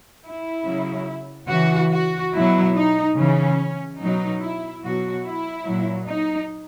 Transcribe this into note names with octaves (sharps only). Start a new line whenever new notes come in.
E4
C#3 F#3
C#3 E3 F#4
F#4
B2 F#3 E4
D#4
C#3 E3 C#4
B2 F#3 D#4
E4
B2 F#3 F#4
E4
A#2 F#3
D#4